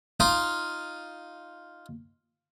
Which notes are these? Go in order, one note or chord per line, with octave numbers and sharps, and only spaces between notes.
D#4 F4